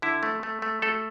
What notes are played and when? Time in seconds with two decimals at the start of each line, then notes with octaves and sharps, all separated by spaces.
0.02 D3 E4
0.23 A3
0.43 A3
0.62 A3
0.82 A3 A4